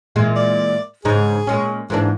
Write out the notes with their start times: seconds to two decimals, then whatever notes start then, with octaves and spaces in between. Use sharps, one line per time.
0.16 A#2 E3 G#3
0.36 D5
1.05 G#2 C#3 D#4 G#4
1.47 A#2 G#3 C#4
1.90 G#2 E3 A#3 D4